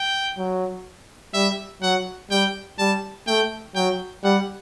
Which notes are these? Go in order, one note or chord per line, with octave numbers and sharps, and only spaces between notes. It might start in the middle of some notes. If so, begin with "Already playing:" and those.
Already playing: G5
F#3
G3 E5
F#3 F#5
G3 G5
G3 A5
A3 G5
F#3 G5
G3 F#5